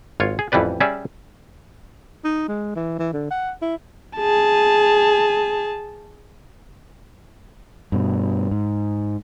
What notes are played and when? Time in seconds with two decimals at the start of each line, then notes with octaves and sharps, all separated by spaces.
0.20 G#1 F4 C#5
0.39 G#4
0.52 A1 F2 E3 G3 B4 D5
0.80 G3 C#4 G#4 D5 E5
2.24 D#4
2.48 G#3
2.76 E3
2.98 E3
3.13 D3
3.30 F#5
3.62 E4
4.17 G#4 A5
7.92 G2 B2
8.51 G#2